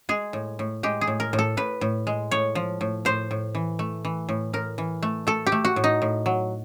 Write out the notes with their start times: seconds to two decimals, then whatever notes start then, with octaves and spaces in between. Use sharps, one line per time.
0.09 G#3 G#4
0.33 A2
0.59 A2
0.83 G#3 G4
1.01 G#4
1.07 A2
1.20 A#4
1.33 A2
1.39 A4
1.57 A2 B4
1.81 A2
2.07 G#3
2.31 A2 C#5
2.55 F3
2.81 A2
3.05 A2 C5
3.31 A2
3.55 E3
3.79 A3
4.05 E3
4.29 A2
4.53 A2 A#4
4.78 E3
5.03 A3
5.27 A3 A4
5.47 G4
5.52 A3
5.65 F#4
5.76 A2
5.84 D#4
6.02 A2
6.26 F#3